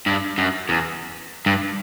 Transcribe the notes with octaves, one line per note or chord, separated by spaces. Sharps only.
G2
F#2
E2
G2